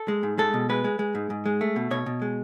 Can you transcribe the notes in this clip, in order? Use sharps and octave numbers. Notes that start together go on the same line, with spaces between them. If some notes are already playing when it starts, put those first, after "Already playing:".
Already playing: A4
G#3
G#2
G#3 A4
B2
G#3 B4
G#3
G#3
G#2
G#2
G#3
A3
B2
B2 C#5
B2
G#3